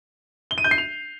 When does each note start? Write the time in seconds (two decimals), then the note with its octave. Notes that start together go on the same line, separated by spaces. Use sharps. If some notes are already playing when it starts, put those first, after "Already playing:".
0.51 G7
0.58 D#7
0.64 G6
0.71 C7
0.78 F7